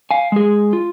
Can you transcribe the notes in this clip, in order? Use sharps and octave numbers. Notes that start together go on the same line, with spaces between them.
F5 G#5
G#3 G#4
F4